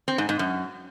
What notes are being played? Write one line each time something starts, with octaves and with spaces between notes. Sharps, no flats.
C4
G#2
G#2
F#2